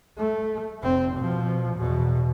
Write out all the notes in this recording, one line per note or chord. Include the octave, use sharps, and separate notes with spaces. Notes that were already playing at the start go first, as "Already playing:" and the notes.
A3
F1 C4
B2 F3
E2 B2